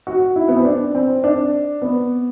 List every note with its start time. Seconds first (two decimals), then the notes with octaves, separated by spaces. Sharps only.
0.07 F#4
0.36 E4
0.49 B3
0.57 C4
0.65 D4
0.95 C4
1.24 D4
1.82 B3